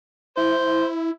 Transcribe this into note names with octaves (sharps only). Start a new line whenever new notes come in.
E4 C5